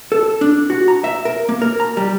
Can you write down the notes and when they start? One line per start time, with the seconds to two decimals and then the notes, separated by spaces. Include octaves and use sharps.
0.12 A4
0.41 D4
0.70 F#4
0.88 A#5
1.04 E5
1.25 A#4
1.49 A#3
1.62 A#4
1.80 A#5
1.97 G3